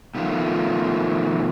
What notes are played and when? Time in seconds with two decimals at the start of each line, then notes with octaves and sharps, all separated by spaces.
0.15 B2 D#3 F3 A3 F4